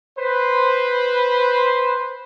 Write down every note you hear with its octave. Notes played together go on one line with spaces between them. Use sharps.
B4 C5